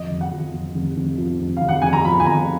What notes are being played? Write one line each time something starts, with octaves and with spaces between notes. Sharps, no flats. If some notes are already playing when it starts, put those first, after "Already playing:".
Already playing: F2 D#5
F1
F#5
F2
F2
F1
F1
F3
F1
F5
F1
F#5
F1 G#5
A#5
F3 B5
G#5
F2 A#5